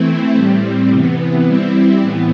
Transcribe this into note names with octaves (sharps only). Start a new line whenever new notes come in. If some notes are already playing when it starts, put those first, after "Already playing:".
Already playing: E3 A3 C4 E4
A2 G3 C4
C3 E3 B3
G3 C4 E4
A2 E3 B3